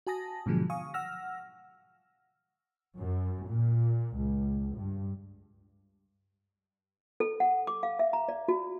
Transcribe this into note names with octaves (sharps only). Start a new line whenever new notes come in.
F#4 G#5 A5 D#6 A#6
G#2 B2 D3 F3 F#3 G#3
F5 G#5 C#6 D#6
F#5 E6 F6 A#6
F#2
A#2
C#2
G2
A4
F#5
D6
F5
E5
A#5
D5
F#4